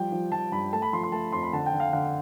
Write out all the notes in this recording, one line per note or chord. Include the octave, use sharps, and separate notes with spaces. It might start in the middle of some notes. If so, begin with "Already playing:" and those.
Already playing: F3 G3 G5
F3
F3 A5
G2 B5
A3 A5
B5
F3 C6
C6
A3 A5
F2 C6
B5
D3 A5
G5
D3
F5
D3 F5